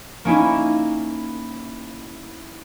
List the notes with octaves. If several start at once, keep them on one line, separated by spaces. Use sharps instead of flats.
A#3 C#4 D#4 E4